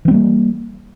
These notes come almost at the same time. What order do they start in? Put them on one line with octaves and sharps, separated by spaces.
E3 C4 G3 A#3